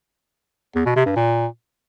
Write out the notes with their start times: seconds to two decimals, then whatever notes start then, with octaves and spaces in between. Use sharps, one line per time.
0.76 E2
0.86 B2
0.96 C3
1.06 G2
1.16 A#2